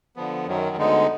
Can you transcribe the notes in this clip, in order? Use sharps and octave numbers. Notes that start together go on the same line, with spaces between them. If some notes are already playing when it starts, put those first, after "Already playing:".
D3 F3 B3
F#2 D#3 F#3
D2 D3 G#3 B3 D#4